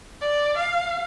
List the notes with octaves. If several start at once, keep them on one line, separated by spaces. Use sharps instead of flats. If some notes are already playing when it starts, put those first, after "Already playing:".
D5
F5